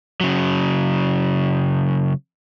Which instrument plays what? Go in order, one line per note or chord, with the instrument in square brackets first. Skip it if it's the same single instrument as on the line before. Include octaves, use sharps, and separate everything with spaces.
[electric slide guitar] C#3 F#3